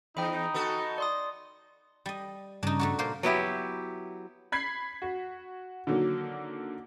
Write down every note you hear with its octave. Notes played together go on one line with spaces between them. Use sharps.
E2 D#4 G5 B5
B3 F#4 A4
D5 C6 D#6
G3 D#5
G2 C#3 D4 D#4
A3 D4 F#4
A#2 A#3 C5
F#3 B3 E4 G4
B5 G#6 B6 C7
F#4
D3 D#3 F#3 A#3